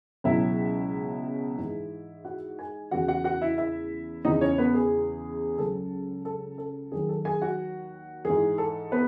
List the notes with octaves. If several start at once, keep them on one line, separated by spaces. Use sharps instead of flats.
C#2 B2 F#3 E4 E5
G#2 E3
F#4 F#5
G#4 G#5
E2 C#3 E3 F#4 F#5
F#4 F#5
F#4 F#5
E4 E5
E4 E5
E2 C#3 E3 D#4 D#5
C#4 C#5
B3 B4
G#4
C#2 C#3 F#3 A4
A4
A4
D#2 D#3 F#3 G#4
A4
G#4 G#5
F#4 F#5
G#2 E3 G#4
A4
B3 B4